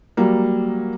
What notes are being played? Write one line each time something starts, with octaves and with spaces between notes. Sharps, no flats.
F#3 G3 A#3